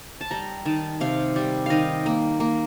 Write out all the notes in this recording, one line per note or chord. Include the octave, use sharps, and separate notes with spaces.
A5
G3 A#5
D#3 A5
C3 F5
G3
D#3 D#5 F5
A#3
A#3